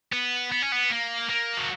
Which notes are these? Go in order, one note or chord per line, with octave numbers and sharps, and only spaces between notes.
B3
B3
C#4
B3
A#3
A#3
F#3